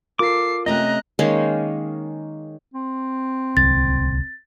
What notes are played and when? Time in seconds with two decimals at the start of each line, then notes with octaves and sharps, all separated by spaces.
0.19 F4 A4 A#4 D6 C7
0.66 C3 A3 C#4 D#5 A#5 F#6
1.19 D#3 G#3 A#3 C#4
2.74 C4
3.57 D1 C2 A6